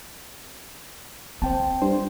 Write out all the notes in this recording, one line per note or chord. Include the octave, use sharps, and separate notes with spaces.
C4 C5 G5 A5
G2 C5